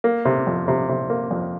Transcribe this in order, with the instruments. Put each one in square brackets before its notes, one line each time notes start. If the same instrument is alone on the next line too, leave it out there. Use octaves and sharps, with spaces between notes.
[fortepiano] A#3
C3
F2
C3
C3
A#3
F2